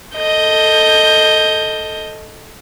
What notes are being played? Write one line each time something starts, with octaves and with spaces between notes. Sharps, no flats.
A4 D#5 G6